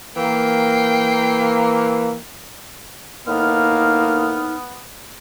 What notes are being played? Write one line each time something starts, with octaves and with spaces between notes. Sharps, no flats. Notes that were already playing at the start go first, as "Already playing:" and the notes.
E3 A#3 G5 C7
A2 D#3 A#3 B3 D#4 F6